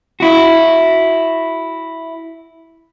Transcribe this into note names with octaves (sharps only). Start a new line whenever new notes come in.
E4 F#4